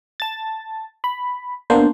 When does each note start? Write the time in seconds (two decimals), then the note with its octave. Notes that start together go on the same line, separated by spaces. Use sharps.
0.20 A5 A6
1.04 B5
1.70 A#3 B3 D4 C5